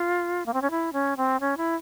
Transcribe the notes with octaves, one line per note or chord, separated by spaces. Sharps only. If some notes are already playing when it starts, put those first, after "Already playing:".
Already playing: F4
A#3
C4
C#4
E4
C#4
C4
C#4
E4